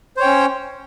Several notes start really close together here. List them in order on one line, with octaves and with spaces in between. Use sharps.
C5 C#5 G5 C#4